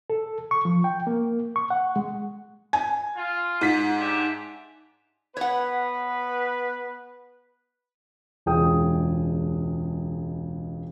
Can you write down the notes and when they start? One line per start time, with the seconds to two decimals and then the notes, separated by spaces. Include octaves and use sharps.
0.10 A4
0.51 C#6
0.65 F3
0.84 G5
1.07 A#3
1.56 C#6
1.70 F#5
1.96 G#3
2.73 G#5
3.16 F4
3.61 G#2 B6
3.99 D4 G4 E5
5.37 B3 B4 C#5 F#5
8.46 E1 C#2 G#4 G5 D#6